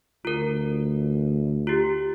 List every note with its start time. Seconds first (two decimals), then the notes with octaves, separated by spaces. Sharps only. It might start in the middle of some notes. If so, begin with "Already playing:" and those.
0.25 D2 F4 A#4
1.67 F4 G4